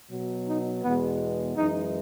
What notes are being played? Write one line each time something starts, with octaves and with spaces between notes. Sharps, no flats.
B2 F#3
D#4
E2 B2 G#3 B3
F#2 E3 G#3 D#4